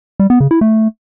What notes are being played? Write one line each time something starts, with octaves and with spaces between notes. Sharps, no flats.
G3
B3
C#3
E4
A3